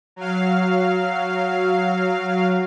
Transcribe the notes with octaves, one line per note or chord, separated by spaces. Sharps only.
F#3 F5